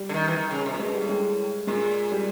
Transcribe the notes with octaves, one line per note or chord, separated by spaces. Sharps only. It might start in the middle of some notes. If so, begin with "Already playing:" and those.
Already playing: G3
D3
D#3
E3
D#3
C#3
C3
A#2
B2 G#3
G3
A2
G#3
A#2 G#3
G3